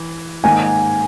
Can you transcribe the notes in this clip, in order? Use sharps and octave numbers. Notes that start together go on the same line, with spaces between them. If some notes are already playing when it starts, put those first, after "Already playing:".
Already playing: E3
G#2 D#3 A#3 G#5